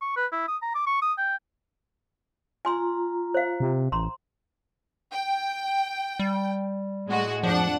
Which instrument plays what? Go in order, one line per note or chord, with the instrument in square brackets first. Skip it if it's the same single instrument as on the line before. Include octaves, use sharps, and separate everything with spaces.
[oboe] C#6
B4
E4
D#6
A#5
D6
C#6
D#6
G5
[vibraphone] F4 A#5 [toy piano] G#5 C6
[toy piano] C5 F5
[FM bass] C3
[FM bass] A1 [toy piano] A#5 C6
[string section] G5
[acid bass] G3
[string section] A2 G#3 F#4
[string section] F2 D4 F#5 [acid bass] F3